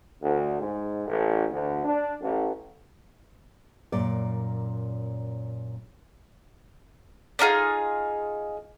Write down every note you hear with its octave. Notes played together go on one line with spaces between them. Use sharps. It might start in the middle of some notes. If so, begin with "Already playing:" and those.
D2
G#2
A1
D2
D4
A1
F#2 A#2 D5
D4 D#4 F4 G#4